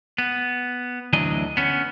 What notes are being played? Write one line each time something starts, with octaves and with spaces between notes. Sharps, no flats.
B3
D2 E3 F#3 D4 D#5
B3 C#4